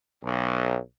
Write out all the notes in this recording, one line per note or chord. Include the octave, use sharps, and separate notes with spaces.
B1